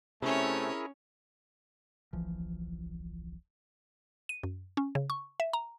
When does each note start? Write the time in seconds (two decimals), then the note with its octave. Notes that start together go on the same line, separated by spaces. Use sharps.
0.22 C3 A3 C#4 E4 G#4 A#4 C#5
2.13 D1 A#1 E3 F3
4.29 D#7
4.43 F#2
4.77 C#4
4.95 C#3
5.10 C#6
5.40 E5
5.53 A#5